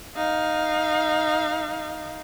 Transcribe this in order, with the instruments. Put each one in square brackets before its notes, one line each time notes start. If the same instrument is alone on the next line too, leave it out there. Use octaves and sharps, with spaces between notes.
[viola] D#4 F5